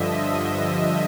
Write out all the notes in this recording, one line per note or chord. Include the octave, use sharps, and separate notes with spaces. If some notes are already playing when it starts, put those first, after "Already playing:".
Already playing: G2 D3 F3 D#5 E5
D#5